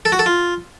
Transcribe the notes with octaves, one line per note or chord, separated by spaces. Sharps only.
A4
F#4
A4
F4